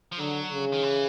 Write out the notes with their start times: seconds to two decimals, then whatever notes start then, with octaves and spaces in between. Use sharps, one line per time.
0.12 F3
0.19 D3 F#3
0.51 C#3
0.73 D#3
0.83 E3